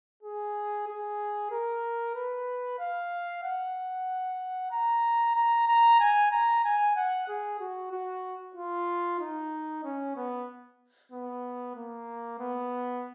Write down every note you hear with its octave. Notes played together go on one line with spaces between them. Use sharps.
G#4
G#4
A#4
B4
F5
F#5
A#5
A#5
A#5
G#5
A#5
G#5
F#5
G#4
F#4
F#4
F4
D#4
C#4
B3
B3
A#3
B3